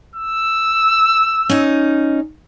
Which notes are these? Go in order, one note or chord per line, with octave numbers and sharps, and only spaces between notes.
E6
C#4 D#4